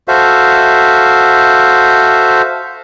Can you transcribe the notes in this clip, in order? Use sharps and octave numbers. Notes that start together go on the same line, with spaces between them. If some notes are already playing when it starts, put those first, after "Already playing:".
F#4 A4 C5 E5 F5